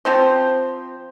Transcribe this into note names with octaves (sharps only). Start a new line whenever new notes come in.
F3 C4 C5